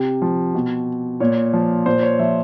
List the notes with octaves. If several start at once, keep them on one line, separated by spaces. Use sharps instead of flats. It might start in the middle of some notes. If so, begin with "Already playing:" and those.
Already playing: C3
F3
B2
A#2 C#5
F3
A#2 C5
C#5
F3 E5